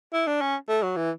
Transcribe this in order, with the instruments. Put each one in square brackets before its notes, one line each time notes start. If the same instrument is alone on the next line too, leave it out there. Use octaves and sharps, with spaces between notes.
[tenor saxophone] E4
D4
C#4
A3
F#3
E3